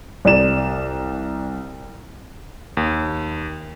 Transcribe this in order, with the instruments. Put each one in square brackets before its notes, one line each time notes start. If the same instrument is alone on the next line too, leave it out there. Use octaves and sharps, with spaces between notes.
[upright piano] C2 D5 E7
[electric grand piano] D#2